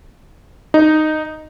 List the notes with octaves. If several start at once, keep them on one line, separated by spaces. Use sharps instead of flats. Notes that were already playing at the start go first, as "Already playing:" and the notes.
D#4